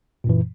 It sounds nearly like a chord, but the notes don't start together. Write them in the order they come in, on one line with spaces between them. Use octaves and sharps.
A#2 F#2 E3